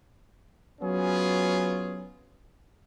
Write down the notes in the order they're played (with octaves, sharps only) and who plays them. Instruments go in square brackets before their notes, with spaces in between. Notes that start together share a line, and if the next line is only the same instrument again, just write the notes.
[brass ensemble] F#3 B3 C#4 F4 G#4